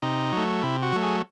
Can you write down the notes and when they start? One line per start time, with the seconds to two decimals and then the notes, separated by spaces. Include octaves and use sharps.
0.02 C3 D#4
0.32 F#3 A3
0.63 C3 E4
0.82 F#4
0.92 F#3 A3
1.03 G#4